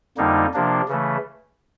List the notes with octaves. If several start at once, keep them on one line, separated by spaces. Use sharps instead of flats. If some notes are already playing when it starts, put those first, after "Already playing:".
F2 D3 G3 A#3 D#4
C3 F3 A#3 D4
C#3 E3 A3